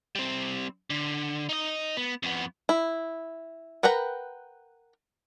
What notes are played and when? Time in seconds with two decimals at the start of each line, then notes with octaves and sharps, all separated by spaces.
0.15 G3 C4
0.90 D3
1.49 D#4 D#5
1.97 B3
2.23 F2 B3
2.69 E4
3.83 A#4 B4 F#5 G5 A#5